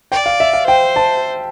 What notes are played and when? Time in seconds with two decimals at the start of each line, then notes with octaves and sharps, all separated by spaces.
0.12 D5 G5
0.26 F5
0.40 E5
0.53 F5
0.67 C5 G5
0.96 A5